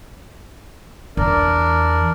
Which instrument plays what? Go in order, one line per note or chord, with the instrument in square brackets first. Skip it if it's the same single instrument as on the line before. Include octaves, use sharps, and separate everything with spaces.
[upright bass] E2 [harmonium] D4 A#4 D5